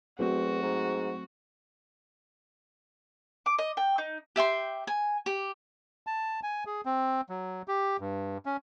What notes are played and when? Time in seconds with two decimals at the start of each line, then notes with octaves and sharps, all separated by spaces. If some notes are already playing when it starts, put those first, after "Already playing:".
0.19 E2 F#3 A3 C4 F#4
0.63 G#2
3.46 D6
3.58 D#5
3.77 G5
3.98 D#4
4.36 G4 E5 G5 C6
4.87 G#5
5.26 G4
6.07 A5
6.43 G#5
6.66 G#4
6.86 C4
7.29 F#3
7.68 G4
8.00 G2
8.46 C#4